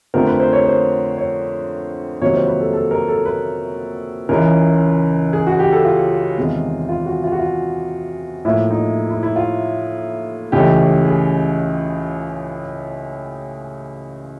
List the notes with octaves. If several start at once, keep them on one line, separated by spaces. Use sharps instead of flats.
F2 D3 F3 A3 C4 A#4
B4
C5
C#5
C5
C#5
F2 C3 D#3 F#3 A#3 C#5
C5
B4
A4
A4
A#4
A4
B4
C#2 C#3 E3 A#4
G#4
F#4
G4
A4
F4
E2 C3 D#3 G#3
F4
F#4
F4
F#4
F4
A2 F3 A#3 E4
D#4
E4
E4
F4
C#2 C#3 E3 A3 G4
G#4